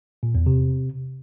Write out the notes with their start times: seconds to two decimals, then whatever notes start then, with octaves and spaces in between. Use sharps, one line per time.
0.23 A#2
0.35 E2
0.46 C3